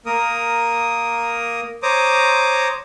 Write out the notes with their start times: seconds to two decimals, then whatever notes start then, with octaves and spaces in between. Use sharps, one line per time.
0.06 A#3 A#4 D#6
1.83 C5 C#5 A#5 D6 D#6